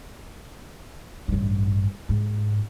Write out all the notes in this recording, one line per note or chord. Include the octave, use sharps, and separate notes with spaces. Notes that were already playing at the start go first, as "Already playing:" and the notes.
A1 G2
G#2